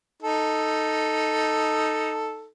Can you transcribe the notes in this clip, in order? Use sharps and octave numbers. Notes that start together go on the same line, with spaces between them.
D#4 A4